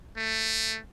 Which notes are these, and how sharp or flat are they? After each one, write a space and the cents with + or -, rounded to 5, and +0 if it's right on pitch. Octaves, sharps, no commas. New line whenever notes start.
A3 +10